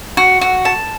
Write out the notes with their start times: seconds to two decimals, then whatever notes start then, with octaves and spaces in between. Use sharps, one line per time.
0.17 F#4
0.41 F#4
0.65 A5